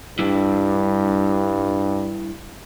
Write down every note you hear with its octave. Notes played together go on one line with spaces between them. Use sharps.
G2 G3 D4 E4